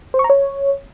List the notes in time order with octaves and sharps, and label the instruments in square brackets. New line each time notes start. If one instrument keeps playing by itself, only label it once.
[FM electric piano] C5
C#6
A#5
C#5